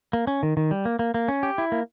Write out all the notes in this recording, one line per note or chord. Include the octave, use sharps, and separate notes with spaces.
A#3
C#4
D#3
D#3
G3
A#3
A#3
A#3
C#4
G4
E4
A#3